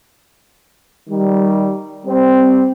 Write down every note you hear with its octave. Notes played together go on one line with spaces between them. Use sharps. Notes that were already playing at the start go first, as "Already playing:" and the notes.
D#3 G3
G3 C4